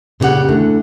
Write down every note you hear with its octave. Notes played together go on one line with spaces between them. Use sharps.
A#2 C#3 C4 G4 F#5
D3 E3 A3